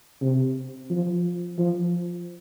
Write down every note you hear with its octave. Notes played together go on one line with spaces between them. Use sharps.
C3
F3
F3